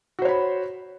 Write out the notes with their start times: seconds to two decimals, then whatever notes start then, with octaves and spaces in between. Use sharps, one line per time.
0.19 F#4
0.22 C5
0.25 C#5
0.28 B5